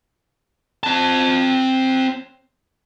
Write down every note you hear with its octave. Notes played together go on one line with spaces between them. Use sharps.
C4 A5